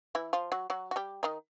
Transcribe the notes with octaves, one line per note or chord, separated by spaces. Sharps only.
E3 E4
F3 F4
F#3 F#4
F#3 F#4
F#4
G3 G4
D#3 D#4